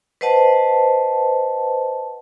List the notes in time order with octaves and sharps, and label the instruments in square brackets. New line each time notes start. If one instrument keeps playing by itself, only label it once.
[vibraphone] B4 C5 D#5 F#5 A5